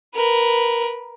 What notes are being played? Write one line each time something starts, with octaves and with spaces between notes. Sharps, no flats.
A#4 B4